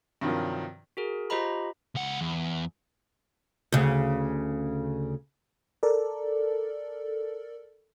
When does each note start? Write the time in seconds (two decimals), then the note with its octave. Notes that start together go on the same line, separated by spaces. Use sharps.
0.21 G2 C3 D#3 F3 F#3
0.97 F#4 G#4 A#4
1.30 F4 G4 C5 D#5 A#5 B5
1.95 C#2 F#5
2.21 E2
3.72 D2 C#3
5.83 A4 A#4 D5